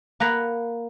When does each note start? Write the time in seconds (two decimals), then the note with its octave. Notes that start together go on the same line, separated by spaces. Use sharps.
0.20 A#3 F#5 A#5 B5